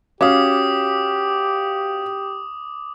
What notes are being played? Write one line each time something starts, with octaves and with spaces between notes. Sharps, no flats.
C#4 F#4 G4 F5 D6 D#6